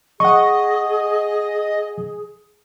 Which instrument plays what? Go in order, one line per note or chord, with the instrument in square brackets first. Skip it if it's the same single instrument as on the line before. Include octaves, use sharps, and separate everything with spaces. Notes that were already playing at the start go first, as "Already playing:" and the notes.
[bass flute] G#4 [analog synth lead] D#5 [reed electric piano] F#5 C#6